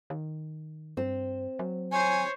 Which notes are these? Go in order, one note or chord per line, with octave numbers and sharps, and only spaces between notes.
D#3
G2 C4
F#3
C5 C#5 G#5